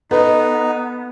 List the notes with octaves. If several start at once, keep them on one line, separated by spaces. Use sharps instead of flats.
B3 D#4 A4 B4 D#5